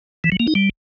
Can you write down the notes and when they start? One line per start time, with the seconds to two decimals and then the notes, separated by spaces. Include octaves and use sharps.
0.24 E3
0.32 F#3
0.40 A#3
0.47 D#4
0.55 G3